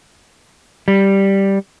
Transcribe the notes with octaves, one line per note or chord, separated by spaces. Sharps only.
G3